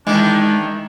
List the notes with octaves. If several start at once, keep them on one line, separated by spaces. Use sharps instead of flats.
D#3 E3 G#3 D4